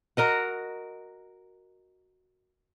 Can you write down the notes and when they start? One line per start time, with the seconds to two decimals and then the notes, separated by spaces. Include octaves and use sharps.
0.17 F#4 A#4 D#5 F#5